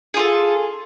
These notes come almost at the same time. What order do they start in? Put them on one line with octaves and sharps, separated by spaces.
G#4 F4 A4